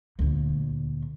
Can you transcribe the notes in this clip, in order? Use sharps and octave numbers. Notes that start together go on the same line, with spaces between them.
D2 A#2